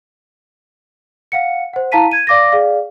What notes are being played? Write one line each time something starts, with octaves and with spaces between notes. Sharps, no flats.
F5 F#5 C#7
C5 F#5
E4 F5 A5 A#5 B6 D#7
G#6 D#7
D5 F5 D6 A6 A#6
G#4 D5 F5